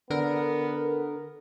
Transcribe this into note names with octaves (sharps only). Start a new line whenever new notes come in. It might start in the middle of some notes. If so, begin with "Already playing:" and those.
D3 B3 A#4